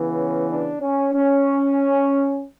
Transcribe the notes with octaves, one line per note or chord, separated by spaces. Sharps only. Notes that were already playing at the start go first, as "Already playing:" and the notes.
Already playing: C#3 E3 B3
C#4
D4
C#4
C#4